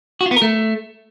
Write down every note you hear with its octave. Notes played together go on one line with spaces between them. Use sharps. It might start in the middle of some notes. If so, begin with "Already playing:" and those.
F#4
F4
B3
A#4
A3